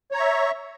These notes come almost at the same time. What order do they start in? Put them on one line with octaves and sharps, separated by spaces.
C#5 A#5 C#6 E5